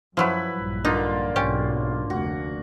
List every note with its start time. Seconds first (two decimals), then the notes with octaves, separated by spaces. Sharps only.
0.17 F#2 F3 F#3 E4 B4
0.56 A#1 G2
0.85 D3 A#3 D#4 F4
1.36 B1 G#2 C#4 G4
2.10 F1 D2 F#4